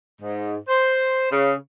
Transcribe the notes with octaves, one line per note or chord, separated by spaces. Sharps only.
G#2
C5
C#3